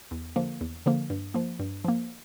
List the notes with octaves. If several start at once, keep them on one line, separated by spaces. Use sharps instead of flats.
E2
D3 F3 A#3
E2
D3 F3 A#3
G2
F3 A#3
G2
F3 A#3